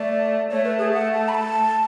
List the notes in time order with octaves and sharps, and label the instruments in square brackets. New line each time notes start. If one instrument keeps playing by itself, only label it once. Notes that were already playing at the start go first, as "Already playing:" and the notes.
Already playing: [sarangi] A3 [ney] D5
[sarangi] A3 [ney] C#5
[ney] B4
G#4
F#5
A5
B5
A5